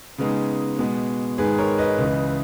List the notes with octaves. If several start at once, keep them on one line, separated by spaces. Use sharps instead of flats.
C#3 G#3 B3 D#4
B2 G#3 B3
G#2 D#3 G#3 G#4 B4
A#4 C#5
B4 D#5
C#2 C#3 E3